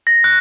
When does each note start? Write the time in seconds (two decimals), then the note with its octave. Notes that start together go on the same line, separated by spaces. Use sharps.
0.07 A#6
0.24 F#6